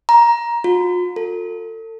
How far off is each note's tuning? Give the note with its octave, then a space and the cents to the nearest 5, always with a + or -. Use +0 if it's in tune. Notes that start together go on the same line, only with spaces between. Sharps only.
A#5 +15
F4 +45
A4 +30